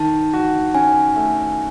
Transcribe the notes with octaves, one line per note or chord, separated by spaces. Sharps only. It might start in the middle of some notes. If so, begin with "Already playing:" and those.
Already playing: D#3 A5
F#4
C#4 G#5
A3